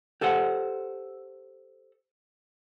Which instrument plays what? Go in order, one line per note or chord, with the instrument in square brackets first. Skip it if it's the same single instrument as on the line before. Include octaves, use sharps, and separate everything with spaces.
[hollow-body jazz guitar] G4 A4 C5 F#5